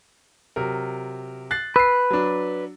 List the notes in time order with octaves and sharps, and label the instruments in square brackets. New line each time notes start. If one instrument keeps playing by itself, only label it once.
[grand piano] C3 F#3 A#4
F#6 A6 C7
[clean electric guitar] B4 [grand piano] E6 C7
[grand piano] F#3 D4